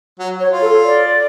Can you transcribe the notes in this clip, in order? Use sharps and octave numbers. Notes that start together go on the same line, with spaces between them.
F#3
C#5
F4
A4
D5